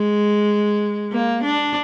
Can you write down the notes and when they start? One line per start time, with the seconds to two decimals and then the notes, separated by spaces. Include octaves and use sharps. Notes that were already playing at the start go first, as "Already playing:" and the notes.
Already playing: G#3
1.12 A#3
1.43 D4